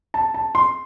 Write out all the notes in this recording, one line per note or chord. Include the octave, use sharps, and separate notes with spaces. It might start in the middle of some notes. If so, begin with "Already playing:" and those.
A5
A5
C6